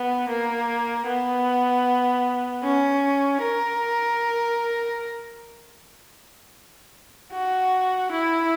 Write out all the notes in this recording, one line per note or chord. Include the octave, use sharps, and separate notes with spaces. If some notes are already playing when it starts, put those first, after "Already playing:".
Already playing: B3
A#3
B3
C#4
A#4
F#4
E4